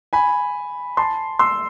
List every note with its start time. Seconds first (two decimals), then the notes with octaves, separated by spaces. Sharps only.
0.13 G#5 B5
0.97 A5 C6
1.39 C6 E6